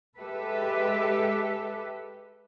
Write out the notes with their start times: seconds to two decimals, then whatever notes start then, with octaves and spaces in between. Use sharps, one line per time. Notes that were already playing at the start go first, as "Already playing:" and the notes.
0.18 G#3 G4 A4 B4 E5